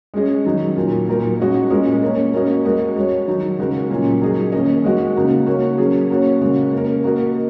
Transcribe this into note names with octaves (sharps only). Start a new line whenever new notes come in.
G#3 C#4 G#4 D#5
D#3 F#3 D#4
A#2 F#3 A#3
A#2 F#3 D#4 A#4
G#3 C#4 F#4 D#5
A#2 G#3 C#4 A#4 D#5
A#3 C#4 A#4 C#5
A#3 C#4 F#4 A#4 D#5
G#3 F#4 A#4 D#5
G#3 F#4 C#5
D#3 F#3 D#4
C#3 G#3 F#4 A#4
A#2 F#3 C#4
F#3 D#4 G#4 D#5
D#3 A#3 C#4 A#4 D#5
G#3 C#4 F#4 D#5
C#3 A#3 D#4 F#4
A#3 F#4 C#5
F#3 C#4 G#4
A#3 C#4 F#4 C#5
C#3 G#3 F#4
A#3 C#4 A#4
A#3 F#4 A#4 D#5